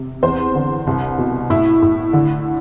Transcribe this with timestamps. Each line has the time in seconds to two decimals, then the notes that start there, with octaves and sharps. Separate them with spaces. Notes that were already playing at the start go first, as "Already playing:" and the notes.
Already playing: C3
0.23 E2 C5
0.55 D3
0.87 C2
1.18 B2
1.50 A2 E4
1.82 A2
2.13 D3